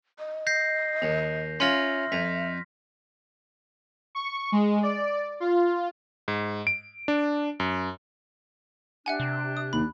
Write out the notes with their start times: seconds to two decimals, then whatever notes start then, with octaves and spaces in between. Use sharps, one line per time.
0.19 D#5
0.47 G6 A#6 C7
1.02 D#2
1.60 C#4 F4 E5 C6 F6 A#6
2.12 F2 B6
4.15 C#6
4.52 G#3
4.83 D5
5.40 F4
6.28 G#2
6.67 D7
7.08 D4
7.60 F#2
9.06 D4 G4 E5 F#5 G#5 F#6
9.20 C3
9.57 D#6
9.73 D#2 B5